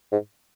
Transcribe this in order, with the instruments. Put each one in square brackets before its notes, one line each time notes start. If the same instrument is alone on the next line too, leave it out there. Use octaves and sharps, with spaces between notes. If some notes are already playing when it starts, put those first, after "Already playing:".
[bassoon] G#2